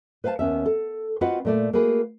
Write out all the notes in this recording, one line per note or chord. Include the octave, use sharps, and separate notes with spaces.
B4 C5 F5 G#5 A5
D#2 B3 C#4 E5
A4
C4 F4 F#4 B4 D#5 F#5
A#2 A3 D5
A3 A#3 F#4 G#4 B4